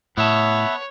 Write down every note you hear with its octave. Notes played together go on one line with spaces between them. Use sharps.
A2 B3 C#5 E5 A5